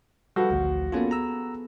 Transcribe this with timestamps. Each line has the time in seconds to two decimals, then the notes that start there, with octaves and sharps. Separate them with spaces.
0.36 F3 G3 F#4 A4 B4 C5
0.50 A1 D2
0.92 A#3 B3 C#4 F4 G#4 A4
1.11 A#5 E6